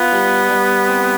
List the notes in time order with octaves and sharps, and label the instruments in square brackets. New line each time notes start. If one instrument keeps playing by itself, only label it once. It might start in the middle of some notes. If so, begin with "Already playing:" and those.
Already playing: [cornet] B3 [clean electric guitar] F4
[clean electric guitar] G3
G3
C4